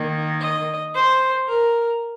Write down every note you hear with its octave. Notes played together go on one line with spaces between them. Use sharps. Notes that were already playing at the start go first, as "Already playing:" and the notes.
Already playing: D#3 A#3
D#5
C5
A#4